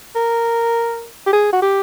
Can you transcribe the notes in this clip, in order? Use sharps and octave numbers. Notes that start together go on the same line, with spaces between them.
A#4
G4
G#4
F#4
G4